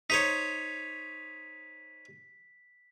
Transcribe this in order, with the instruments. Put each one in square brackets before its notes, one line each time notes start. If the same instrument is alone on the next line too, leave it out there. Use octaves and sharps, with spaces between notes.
[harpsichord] D#4 C5 C#5 [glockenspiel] B6